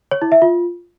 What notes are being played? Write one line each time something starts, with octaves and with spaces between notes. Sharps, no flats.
C#5
E4
E5
F4